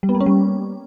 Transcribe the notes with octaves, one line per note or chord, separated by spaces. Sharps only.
G3
B3
A#3
C#4
G3